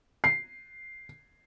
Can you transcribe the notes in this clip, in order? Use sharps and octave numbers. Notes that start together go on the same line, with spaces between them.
C7